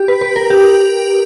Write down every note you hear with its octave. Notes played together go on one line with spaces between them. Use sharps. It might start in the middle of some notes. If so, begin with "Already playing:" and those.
Already playing: G4
B4
B4
A#4
G4